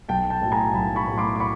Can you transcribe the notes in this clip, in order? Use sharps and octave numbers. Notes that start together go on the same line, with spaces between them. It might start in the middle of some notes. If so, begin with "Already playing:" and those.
B1 G5 A5
G5 A5
A2 F#3
G#5 A#5
B1 A5 B5
B5 C#6
A2 F#3
C6 D6
D6
B5 C#6